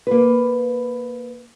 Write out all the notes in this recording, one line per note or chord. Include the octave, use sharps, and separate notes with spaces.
A#3 B4